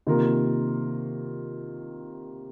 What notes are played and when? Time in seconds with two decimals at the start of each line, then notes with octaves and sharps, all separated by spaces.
0.07 C3 D#3 A#3 F4 A#4